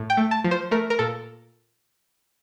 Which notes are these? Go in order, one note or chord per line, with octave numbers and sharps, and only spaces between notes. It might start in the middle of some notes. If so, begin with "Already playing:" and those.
Already playing: A2
G5
A3
A5
F3
C5
A3 A#4
A#4
A#2 A4